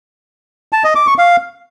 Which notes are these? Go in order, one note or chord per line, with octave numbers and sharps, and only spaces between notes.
A5
D#5
D6
C#6
F5